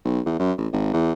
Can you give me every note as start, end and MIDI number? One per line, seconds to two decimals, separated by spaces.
0.05 0.20 35
0.26 0.37 40
0.39 0.52 42
0.57 0.67 33
0.72 0.90 32
0.93 1.12 40